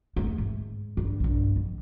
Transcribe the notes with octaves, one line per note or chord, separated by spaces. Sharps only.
D#2 A3
G#2
G2
B1 G2
F2